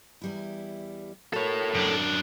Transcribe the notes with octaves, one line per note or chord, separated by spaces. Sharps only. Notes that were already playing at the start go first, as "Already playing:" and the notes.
E2 G3 E4
F#4 A4 A#4 C#5
F#2 D4